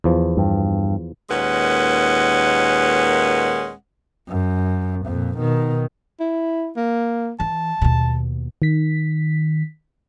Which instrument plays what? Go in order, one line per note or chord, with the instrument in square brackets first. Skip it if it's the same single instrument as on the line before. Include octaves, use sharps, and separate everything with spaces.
[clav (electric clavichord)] E2 F3
[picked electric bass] G2
[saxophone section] D#2 A#2 G#3 C#4 B4 F#5
[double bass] F#2
F2 A#2
B2 D#3
[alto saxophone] E4
A#3
[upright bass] E3 [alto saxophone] A5
[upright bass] D#2 B2
[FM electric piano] D#3 B6